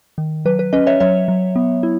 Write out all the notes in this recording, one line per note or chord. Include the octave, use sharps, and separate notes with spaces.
D#3
F#3 B4
B4
C#4 B4 D#5
C#5 E5
F#3 C#5 E5
F#3
B3
E4